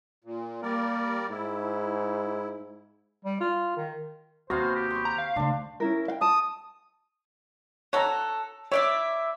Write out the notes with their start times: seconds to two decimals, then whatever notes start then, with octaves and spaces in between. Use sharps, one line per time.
0.24 A#2
0.63 G3 A#3 A#4 D5
1.30 G#2 E4
3.25 G3
3.40 F4
3.77 D#3
4.50 D#2 C3 B3 F#4 C5 F5
4.75 G4
4.90 C6 C#6
5.05 A#5
5.18 F5
5.36 C#3 A3 D4 C5
5.80 C#4 E4 A#4
6.08 F5 G5
6.21 A5 D#6
7.93 F#4 A4 C#5 A#5
8.72 E4 C#5 D5 E5